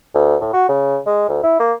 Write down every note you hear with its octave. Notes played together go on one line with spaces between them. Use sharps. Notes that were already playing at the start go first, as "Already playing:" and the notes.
D2
A2
F#4
C#3
G#3
D2
E4
A#3